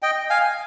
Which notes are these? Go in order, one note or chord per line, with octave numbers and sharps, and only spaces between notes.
D#5 G5
F5 G#5